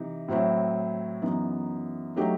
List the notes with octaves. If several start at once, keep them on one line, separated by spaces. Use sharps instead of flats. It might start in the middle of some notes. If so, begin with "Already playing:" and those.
Already playing: C3 E3 D#4
A2 F#3 C4 E4
F#2 E3 B3 D#4
F#3 A3 D#4 G4